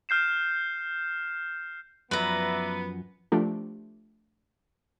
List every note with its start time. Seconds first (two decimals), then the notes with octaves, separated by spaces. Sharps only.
0.09 F6 G6 C7 E7
2.11 F#2 F3 B3 B4 D5 E5 A#5
3.32 F3 A3 D4 F4 G4